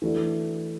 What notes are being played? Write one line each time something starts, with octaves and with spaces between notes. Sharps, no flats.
E3 A3 D4 F#4